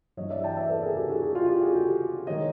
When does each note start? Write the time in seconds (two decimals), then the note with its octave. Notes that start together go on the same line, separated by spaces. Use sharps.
0.17 G2 E3 G3 C#5 D#5
0.30 D5 E5
0.44 G5 A5
0.57 D5 E5
0.69 A4 B4
0.83 G#4 A#4
0.97 G4 A4
1.10 F#4 G#4
1.22 F#4 G#4
1.35 F4 G4
1.49 F4 G4
1.61 F#4 G#4
1.75 G4 A4
2.27 D#3 G#3 C#5 D#5